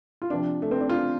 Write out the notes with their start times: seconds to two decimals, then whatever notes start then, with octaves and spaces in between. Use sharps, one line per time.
0.22 F4
0.30 C3 F3 D4
0.62 A3
0.71 C4
0.81 D4
0.89 F4